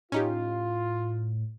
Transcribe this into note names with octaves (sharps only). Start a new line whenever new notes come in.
A2 C#4 D#4 F4 G4